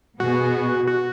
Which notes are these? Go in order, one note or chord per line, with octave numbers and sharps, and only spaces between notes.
B2 B3 F#4 G#4
F#4